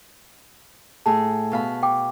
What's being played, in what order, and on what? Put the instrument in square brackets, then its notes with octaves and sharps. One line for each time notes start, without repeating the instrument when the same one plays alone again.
[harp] A2 G#4 [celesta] A5
[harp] B2 F5 B5
[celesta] G5 D6